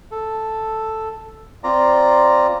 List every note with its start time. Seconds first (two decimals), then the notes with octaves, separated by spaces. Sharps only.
0.11 A4
1.64 C4 F4 D5 A#5